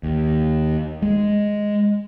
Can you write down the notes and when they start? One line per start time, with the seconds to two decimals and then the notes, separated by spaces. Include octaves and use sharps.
0.03 D#2
1.02 G#3